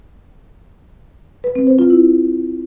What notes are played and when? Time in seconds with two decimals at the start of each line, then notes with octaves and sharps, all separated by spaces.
1.44 B4
1.55 C4
1.67 C5
1.79 F4
1.90 E4